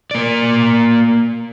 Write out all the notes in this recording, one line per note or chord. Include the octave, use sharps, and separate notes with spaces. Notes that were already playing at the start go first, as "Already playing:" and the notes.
A#3 D5